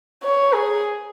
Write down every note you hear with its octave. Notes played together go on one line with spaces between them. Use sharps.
C#5
G#4